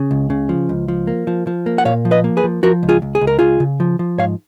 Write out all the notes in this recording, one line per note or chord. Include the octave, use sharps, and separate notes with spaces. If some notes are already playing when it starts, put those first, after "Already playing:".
Already playing: C#3
C#2
C#3
F3
C#2
F3
A#3
F3
F3
A#3
F#5
A#2 C#5 F5
F3
B4 D#5
A#3
G#4 B4
F3
F3 F#4 A#4
C#2
F4 G#4
C#2
G#4
C#2
A#4
C#2 F4 G#4
C#3
F3
F3
G#2 C#5 F5